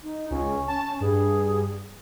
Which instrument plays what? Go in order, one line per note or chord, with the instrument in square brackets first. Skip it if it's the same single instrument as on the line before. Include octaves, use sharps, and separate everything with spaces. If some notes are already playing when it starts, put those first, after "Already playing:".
[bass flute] D#4
[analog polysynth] C#2 [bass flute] C#4
[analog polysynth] A5
[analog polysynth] G2 [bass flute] G#4